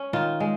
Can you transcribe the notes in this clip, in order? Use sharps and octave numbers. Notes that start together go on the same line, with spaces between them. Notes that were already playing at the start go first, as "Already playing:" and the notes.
Already playing: C#4
D#3 F4
G#3